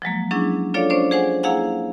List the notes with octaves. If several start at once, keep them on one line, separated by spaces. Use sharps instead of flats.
F3 F#3 G#3 A#3
F#3 C#4 D4 E4 G#4
D4 F4 A4 C#5 D5 F5
C#4 D4 C5 D5
G#4 C5 F#5 G#5
A#3 E4 G#4 F5 F#5 G#5